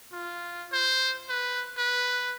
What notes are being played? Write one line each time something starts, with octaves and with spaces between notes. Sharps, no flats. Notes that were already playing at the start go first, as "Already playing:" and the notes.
F4
C5
B4
B4